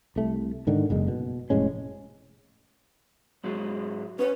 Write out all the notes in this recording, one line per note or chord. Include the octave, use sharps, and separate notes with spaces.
C2 A3
G#2 D3 D#3
F#1 F#2 G#3
B2
F1 A2 G#3 C#4
G#2 F#3 G#3
C#4 B4 C#5